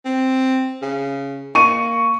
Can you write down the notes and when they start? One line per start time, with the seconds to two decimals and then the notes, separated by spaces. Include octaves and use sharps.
0.05 C4
0.82 C#3
1.55 A#3 C#6 D#7